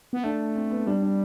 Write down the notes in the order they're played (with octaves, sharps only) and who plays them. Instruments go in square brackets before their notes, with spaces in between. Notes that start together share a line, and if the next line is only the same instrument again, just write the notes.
[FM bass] B3
[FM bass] A3 [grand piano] D4
[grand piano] C4
B3
[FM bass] G3 [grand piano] D4
[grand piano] D4